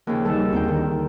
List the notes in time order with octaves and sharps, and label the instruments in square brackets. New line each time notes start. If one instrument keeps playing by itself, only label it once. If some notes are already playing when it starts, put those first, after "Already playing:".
[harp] D#2 C#3 [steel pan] F3
[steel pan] D#3 G3 A4
[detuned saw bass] D2 [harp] C4 D#4 G5
[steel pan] D3 [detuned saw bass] D#3